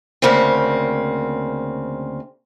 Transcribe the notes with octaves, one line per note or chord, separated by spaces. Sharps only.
D2 C#3 A#3 C4